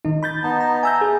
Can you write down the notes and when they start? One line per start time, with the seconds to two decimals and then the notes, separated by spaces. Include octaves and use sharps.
0.05 D#3 D#4
0.23 B5 G6 A6
0.43 B3 D#4 A5
0.60 A#5
0.83 E5 G#5 A#5 E6 G6
1.01 G#4 B4